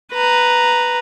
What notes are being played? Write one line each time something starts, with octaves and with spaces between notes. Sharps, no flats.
B4 A#5